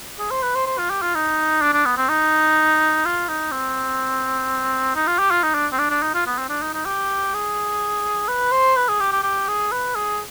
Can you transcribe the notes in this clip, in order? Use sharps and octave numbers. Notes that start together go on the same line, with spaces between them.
G#4
C5
B4
C5
C5
F4
G4
F4
D#4
D4
D4
B3
C4
D#4
F4
D#4
C4
D#4
F4
G4
F4
D#4
D4
C4
D4
D4
D#4
F4
B3
C4
D4
D#4
D#4
G4
G#4
B4
C5
B4
G#4
G4
G4
G4
G#4
B4
G#4